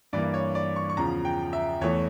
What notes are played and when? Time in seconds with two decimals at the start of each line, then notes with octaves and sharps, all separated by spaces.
0.13 G2 E3 A#3 D5
0.34 C#5
0.55 D5
0.76 C#6
0.89 C#6
0.97 E2 C#3 F3 A#5
1.25 G5
1.53 E5
1.81 E2 E3 A3 C#5